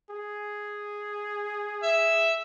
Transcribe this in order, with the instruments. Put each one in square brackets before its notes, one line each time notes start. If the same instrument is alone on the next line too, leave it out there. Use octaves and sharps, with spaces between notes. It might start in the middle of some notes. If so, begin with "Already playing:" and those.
[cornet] G#4
[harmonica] E5